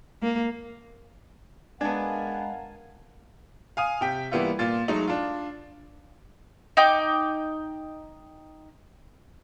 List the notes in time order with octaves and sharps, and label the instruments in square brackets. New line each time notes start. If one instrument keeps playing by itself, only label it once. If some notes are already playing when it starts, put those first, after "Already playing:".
[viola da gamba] A#3
[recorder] G#3 [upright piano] B3 D4 [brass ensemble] A#4 F5 F#5 [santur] G#5 A5
[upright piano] F5 G#5 D#6
C3 G5 B6
E3 G3 A#3 B3 E4 F4
A#2 F4 A6
F#3 G#3 A3 D#4
D4 F4
[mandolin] D#4 G5 D6